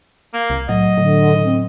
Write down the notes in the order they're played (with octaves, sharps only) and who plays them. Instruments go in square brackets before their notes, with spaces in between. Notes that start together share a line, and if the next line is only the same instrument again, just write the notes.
[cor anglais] A#3
[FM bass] C2
[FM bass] A2 [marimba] F#3 [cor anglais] D#5
[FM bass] A2 [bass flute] D3
[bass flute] C4